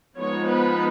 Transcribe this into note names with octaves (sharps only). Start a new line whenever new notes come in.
F3 G#3 B3 D#4 C#5
B4